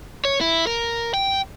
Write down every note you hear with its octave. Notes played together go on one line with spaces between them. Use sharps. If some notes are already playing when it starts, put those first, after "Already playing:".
C#5
E4
A#4
G5